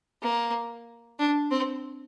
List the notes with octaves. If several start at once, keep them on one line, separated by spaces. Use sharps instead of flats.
A#3
D4
C4